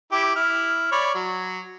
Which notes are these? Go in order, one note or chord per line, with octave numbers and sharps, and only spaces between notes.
E4 G4 D6
E4 F6
C#5 D5 B5
F#3